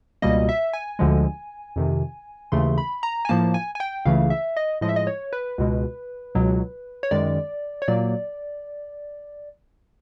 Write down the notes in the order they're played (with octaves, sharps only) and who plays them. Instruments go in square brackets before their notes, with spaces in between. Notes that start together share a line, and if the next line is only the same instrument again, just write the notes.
[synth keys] C#2 B2 G3 A#3 D#5
E5
G#5
D2 D3 F3 G#3
F2 C3 D#3
D#2 C#3 E3 A3 C6
B5
A#5
G#5
A2 F3 A#3 A5
G#5
G#5
G5
C#2 C#3 E3 A3 F5
E5
D#5
A2 F3 G#3 D#5
E5
D#5
C#5
B4
C#2 B2 G#3
C#2 B2 F#3
C#5
F#2 D#3 G#3 D5
C#5
A#2 F#3 A#3 D5